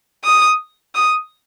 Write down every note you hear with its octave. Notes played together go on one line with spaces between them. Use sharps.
D#6
D#6